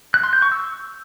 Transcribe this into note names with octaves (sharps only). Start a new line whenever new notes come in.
F#6
C6
G6
C#6
E6